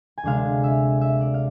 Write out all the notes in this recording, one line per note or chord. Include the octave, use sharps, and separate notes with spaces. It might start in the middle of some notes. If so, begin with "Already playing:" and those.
G#5
D2 C3 G#3 D4 F5
E5
E5
D5
F5